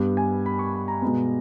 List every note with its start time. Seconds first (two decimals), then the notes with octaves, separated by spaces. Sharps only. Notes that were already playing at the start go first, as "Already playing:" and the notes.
Already playing: G2 G3 B3
0.17 G#5
0.46 B5
0.59 C#6
0.74 B5
0.88 A#5
1.02 B2 G#3 B3